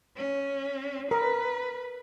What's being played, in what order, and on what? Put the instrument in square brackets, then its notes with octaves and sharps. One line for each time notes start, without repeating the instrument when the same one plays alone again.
[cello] C#4
[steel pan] A#4 [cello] B4